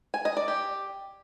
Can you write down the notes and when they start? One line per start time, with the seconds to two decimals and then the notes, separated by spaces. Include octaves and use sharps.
0.14 G#5
0.25 D#5
0.37 D5
0.48 G4